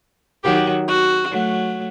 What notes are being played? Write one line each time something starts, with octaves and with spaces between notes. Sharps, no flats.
D#3 F#3 G4
F#4
F#3 A3